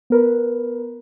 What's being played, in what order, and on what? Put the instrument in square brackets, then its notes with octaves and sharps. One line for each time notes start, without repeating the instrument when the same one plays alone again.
[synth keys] B3 A#4 B4